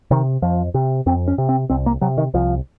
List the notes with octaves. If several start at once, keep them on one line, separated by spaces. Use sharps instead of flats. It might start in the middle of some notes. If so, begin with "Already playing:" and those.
C3 D#3
F2 F3
C3
F2 C4
C#4
C3
C4
C2 C4
A#3
C3 F#3
D#3
C2 F3